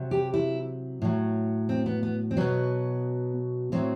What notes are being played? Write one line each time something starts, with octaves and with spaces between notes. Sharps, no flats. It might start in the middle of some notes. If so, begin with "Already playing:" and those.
Already playing: C3 F#3
G4
E4
A2 F#3
C4
B3
B3
C4
B2 F#3 B3
A2 F#3 C4